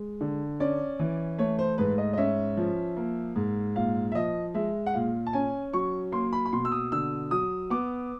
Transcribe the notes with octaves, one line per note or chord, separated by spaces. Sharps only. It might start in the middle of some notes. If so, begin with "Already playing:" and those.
Already playing: G#3
D3
C#4 D5
E3
A3 C#5
C5
G#2 B4
D#5
D#5
C#4 E5
F3
A#3
G#2
A#2 F5
E5
F3 D#5
G#3 E5
F#5
A#2 F5
A5
C#4 G#5
F#3 C#6
A#3 C6
B5
B5
B2 C6
E6
D#6
D3 E6
F#3 D#6
B3 D6